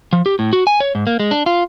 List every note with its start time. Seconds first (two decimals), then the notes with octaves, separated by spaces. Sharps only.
0.13 F3
0.26 G4
0.39 A2
0.53 F#4
0.67 G#5
0.80 C#5
0.95 G#2
1.07 A#3
1.20 G#3
1.31 D4
1.46 F4